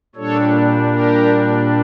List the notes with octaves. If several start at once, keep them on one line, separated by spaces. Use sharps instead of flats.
A#2 G3 D4 A4 C#5
G4 A#4